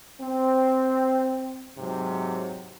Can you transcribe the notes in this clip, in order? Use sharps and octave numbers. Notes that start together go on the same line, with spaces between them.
C4
G#2 C3 F#3